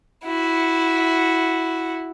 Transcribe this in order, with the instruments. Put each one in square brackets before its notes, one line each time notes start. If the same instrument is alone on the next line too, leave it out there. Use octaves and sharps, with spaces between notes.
[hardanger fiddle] E4 F#4